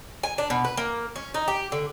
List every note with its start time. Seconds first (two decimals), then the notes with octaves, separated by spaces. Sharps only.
0.23 G#5
0.38 D4
0.50 B2
0.64 B4
0.77 A#3
1.16 C#4
1.34 D#4
1.48 G4
1.72 D3